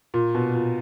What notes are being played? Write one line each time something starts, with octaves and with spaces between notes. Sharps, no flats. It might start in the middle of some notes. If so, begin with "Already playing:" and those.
A#2
B2
A#2